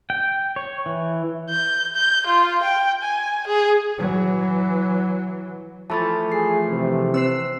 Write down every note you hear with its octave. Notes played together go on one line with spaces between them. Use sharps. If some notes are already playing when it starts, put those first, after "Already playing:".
G5
C#5
E3
G6
G6
F4
G5
G#5
G#4
E3 F#3
E3 F3 A3 A5 B5 A6
G#4 C7
C3
C4 C5 E6 C7